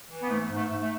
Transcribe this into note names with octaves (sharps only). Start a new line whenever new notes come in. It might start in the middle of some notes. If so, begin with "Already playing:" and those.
E3
B3
G#2 A3
G#2
A3
G#2
A3